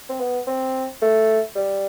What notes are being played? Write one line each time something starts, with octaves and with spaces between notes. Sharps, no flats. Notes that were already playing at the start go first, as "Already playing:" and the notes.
C4
B3
C4
A3
G3